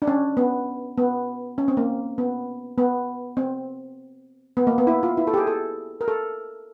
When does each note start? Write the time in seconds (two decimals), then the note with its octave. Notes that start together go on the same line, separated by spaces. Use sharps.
0.02 D4
0.07 C#4
0.37 B3
0.97 B3
1.58 C#4
1.68 C4
1.77 A#3
2.18 B3
2.78 B3
3.37 C4
4.57 B3
4.67 A#3
4.78 B3
4.87 E4
5.03 F4
5.17 E4
5.27 A4
5.34 G4
5.37 G#4
5.47 A4
6.01 A#4
6.08 A4